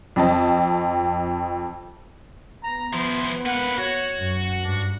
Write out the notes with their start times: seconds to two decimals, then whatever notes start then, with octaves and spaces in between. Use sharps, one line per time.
0.16 F2 C4 D#5 A5
2.63 B3 A#5
2.93 F3 E4 C5
3.45 A#3 B4 F#5
3.77 F#4 C#5
4.18 F#2
4.64 G2 D4